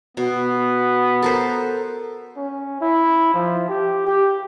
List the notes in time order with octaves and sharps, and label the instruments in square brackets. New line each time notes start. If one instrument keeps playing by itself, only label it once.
[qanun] B2 [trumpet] B3
[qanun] A4 A#4 C5
[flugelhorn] C#4
E4
F3
G4
G4